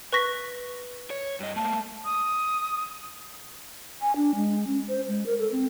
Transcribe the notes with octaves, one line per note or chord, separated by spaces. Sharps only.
B4 C#6 A#6 B6
C#5
G2 D#5
A3 A#3 A5
D#6
G#5
D4
G#3
C#4
C5
G#3
A#4
A4
C4